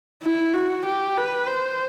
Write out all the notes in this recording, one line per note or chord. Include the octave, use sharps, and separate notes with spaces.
E4
F#4
G4
B4
C5